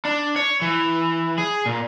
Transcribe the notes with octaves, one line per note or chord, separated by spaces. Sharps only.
D4
C#5
E3
G#4
A#2